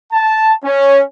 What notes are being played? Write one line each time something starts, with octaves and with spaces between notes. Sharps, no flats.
A5
C#4